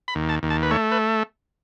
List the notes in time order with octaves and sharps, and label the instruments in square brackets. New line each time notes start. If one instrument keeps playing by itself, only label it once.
[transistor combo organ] B5
D#2
A5
D#2
A5
B4
A3 C#5
B4